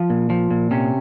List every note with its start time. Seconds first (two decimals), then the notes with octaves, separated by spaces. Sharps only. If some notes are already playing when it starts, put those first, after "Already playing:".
Already playing: F3
0.10 A#2
0.30 F3
0.51 A#2
0.71 C3 C#4